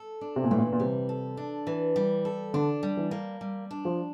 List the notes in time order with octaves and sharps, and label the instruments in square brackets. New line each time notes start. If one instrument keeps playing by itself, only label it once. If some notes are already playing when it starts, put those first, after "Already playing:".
Already playing: [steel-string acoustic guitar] A4
D4
[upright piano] C3
A#2
[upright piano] A2 [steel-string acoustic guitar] E3
[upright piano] A#2
A#2
[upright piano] C3 [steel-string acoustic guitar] G3
[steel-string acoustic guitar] A4
D4
E3
G3
A4
[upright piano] D3 [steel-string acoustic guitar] D4
[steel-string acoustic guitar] G3
[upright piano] E3
[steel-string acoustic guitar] A#3
G3
D4
[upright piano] F3